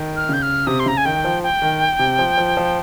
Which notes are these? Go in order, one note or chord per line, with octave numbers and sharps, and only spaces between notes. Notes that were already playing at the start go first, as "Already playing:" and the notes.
Already playing: D#3
F6
C#3 G6
F6
C3 D#6
C6
C#3 A#5
G#5
D#3 G5
F3
G5
D#3
C3
F3
F3
F3